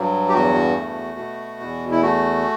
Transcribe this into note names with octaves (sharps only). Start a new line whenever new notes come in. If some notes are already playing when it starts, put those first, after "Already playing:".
Already playing: G2 F#3
G4
E2 F#4
A3
B2
E2
E4
A3 F#4